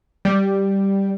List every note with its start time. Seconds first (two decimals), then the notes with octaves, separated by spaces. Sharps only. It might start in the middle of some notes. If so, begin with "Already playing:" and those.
0.25 G3